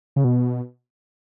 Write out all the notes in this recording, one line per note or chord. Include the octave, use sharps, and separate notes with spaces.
C#3
B2